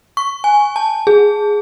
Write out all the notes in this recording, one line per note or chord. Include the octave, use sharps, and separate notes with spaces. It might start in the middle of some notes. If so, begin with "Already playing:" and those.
C#6
G#5
A5
G#4